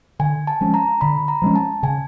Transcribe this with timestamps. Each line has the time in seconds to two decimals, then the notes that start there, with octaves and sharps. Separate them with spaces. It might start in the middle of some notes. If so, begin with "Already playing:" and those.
0.19 D3 G#5
0.47 A5
0.61 F3 G#3 C#4
0.74 A#5
1.01 D3 B5
1.28 A#5
1.42 F3 G#3 C#4
1.56 A5
1.83 C#3 G#5